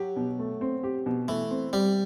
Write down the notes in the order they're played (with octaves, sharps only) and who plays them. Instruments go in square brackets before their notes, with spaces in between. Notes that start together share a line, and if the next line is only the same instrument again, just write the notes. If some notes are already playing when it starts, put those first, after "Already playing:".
Already playing: [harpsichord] F#3 [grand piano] G4
[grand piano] B2
A3
C4
G4
B2
[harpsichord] E3 [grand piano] A3
[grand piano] C4
[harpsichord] G3 [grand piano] G4